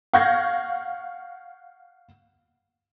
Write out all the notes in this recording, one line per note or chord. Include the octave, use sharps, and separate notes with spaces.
F5 F#5 C#6 G6 G#6 A#6